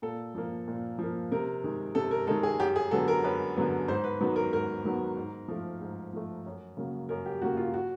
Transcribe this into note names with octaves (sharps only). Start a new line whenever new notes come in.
A#2 A4
F3 A#3
A#2
F3 A#3
C3 A#4
D#3 G#3
C3 A4
A#4
D#3 G#3 A4
G#4
F#2 G4
G#4
D3 F#3 B3 A4
A#4
F#2 B4
D3 F#3 B3
G#2 C5
B4
D#3 F#3 B3
A#4
G#2 A#4
D#3 F#3 B3
G#2
F3 A3
G#2
F3 A3
F#2
C#3 F#3 A#3
F#2 A#4
G4
C#3 F#3 A#3 F#4
F4
F#4